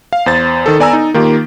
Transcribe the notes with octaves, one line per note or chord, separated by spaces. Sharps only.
F5
E2 C5 A6
D#3 A4
B3 D5 G#5 A#5 E6
D#4
D#3 A#3 F4 G4